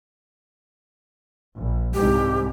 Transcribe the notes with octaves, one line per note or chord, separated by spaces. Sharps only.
A#1
C2 G#2 G4